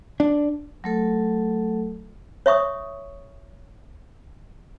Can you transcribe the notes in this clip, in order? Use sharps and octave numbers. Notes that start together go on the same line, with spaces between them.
D4
F#3 A3 A4
C#5 E5 C#6 D#6